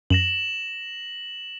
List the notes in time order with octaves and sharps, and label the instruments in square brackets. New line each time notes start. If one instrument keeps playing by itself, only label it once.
[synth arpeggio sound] F#2 [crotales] A#6 E7 F#7